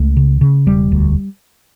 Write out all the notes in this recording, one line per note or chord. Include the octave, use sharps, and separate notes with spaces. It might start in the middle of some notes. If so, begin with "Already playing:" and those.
Already playing: C#2 A3
C#3
C#3
E1 G3
D2